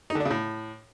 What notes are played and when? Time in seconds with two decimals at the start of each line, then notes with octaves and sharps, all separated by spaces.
0.10 D#4
0.15 D3
0.20 D4
0.25 C#3
0.31 A2